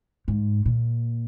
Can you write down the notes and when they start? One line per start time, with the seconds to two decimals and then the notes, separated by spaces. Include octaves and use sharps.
0.28 G#2
0.65 A#2